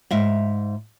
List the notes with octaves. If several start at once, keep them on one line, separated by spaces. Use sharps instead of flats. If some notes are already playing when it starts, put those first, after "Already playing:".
G#2 E5 F5